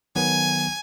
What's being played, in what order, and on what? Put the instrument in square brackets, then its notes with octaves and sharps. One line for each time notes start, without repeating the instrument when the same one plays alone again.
[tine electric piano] D#3 F#3 B3 [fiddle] G#5